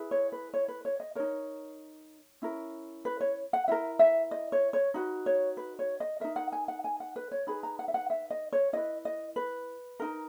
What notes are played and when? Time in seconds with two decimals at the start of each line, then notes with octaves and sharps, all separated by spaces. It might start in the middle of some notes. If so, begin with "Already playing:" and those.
Already playing: E4 G#4 B4
0.11 C#5
0.32 B4
0.54 C#5
0.68 B4
0.85 C#5
1.00 D#5
1.15 D#4 A#4 C#5
2.42 C#4 E4 A#4
3.05 B4
3.21 C#5
3.53 F#5
3.68 E4 A#4 E5
3.99 E5
4.31 D#5
4.52 C#5
4.73 C#5
4.94 D#4 F#4 B4
5.26 C#5
5.57 B4
5.79 C#5
6.00 D#5
6.20 D#4 A#4 E5
6.36 F#5
6.52 G#5
6.68 F#5
6.84 G#5
7.00 F#5
7.16 B4
7.32 C#5
7.47 D#4 G#4 B4 B5
7.63 A#5
7.79 F#5
7.88 E5
7.94 F#5
8.10 E5
8.30 D#5
8.53 C#5
8.73 E4 B4 D#5
9.05 D#5
9.36 B4
10.00 D#4 A#4